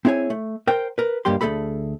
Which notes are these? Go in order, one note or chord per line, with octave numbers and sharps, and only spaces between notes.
C4 E4 G#4 C#5 G#5
A3
A#4 C5 G5
A#4 B4
C#2 G2 G3 A#3 G4 C6
D2 A3 G#4 A4 B5